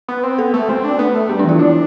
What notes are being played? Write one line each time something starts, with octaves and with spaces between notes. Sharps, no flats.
B3
C4
B3 A4
A3
A3 C4
D4
B3
A3
G3 B3
D4
E3 F4
D4 E4